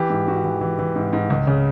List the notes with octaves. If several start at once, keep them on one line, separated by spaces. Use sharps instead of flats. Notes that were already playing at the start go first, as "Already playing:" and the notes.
Already playing: E3 G4
G#2
G#2 F#4
E3
E3
E3
G#2
G#2
C#2
C#3